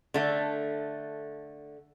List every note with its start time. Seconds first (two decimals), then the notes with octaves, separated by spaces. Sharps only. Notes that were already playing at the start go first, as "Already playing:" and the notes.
0.14 D3 A3